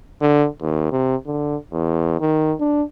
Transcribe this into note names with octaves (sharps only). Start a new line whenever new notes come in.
D3
D#2
C3
D3
E2
D#3
D4